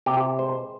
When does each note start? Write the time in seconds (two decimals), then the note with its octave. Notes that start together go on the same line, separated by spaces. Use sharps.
0.06 C3 G4
0.39 G#3 C5